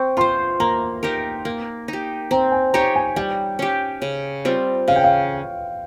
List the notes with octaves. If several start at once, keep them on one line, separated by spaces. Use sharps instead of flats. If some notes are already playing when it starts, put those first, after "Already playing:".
Already playing: C4 C#6
F4 C5 C6
A#3 A#5
D#4 G4 A#4
A#3
D#4
G4
C4 A#5
G#5
D#4 G4 C#5 A#5
G#5
G3 G5
C#4 G4
C#3
G3 C4 F4
C#3 F5
G5
F5